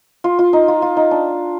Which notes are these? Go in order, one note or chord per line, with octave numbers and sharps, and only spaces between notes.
F4
F4
D#4
F4
F4
D#4
D4